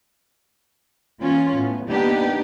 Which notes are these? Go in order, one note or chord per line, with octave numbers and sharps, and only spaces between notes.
E3 A#3 C#4 F4
A2 B3
A#3 B3 D4 D#4 G4